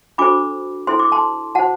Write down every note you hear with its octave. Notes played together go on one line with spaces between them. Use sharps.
D4 F#4 A4 C5 B5 D6
E4 A4 C5 C6
D6
A5 C6
F#4 C5 F#5 A5